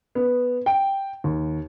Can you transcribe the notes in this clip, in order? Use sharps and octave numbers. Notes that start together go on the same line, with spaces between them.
B3
G5
D#2